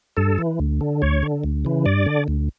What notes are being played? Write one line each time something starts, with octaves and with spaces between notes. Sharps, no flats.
G2 A4
E3
D2
D3
D2 C#5
D3
D2
C#3 E3
G2 D5
D3
D2